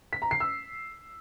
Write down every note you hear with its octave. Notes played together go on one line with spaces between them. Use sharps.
B6
A#5
C7
E6